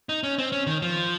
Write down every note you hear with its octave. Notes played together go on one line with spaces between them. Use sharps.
D#4
C#4
C4
C#4
D#3
F3